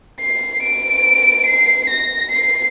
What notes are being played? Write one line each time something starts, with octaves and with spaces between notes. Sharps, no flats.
C7
D7
C7
A#6
C7